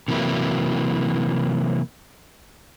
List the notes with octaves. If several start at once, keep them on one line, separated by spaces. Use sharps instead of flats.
C3 E3 F#3 A#3 E4